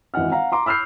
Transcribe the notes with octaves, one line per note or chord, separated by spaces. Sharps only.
G#1 E3 D#5 F#5 F6
F5 F#5 A#5
A#5 C6 D6
B5 E6 F6 G6 C7